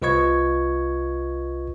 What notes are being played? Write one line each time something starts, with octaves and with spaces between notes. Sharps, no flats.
C2 F4 B4 D#5 C#6 G#6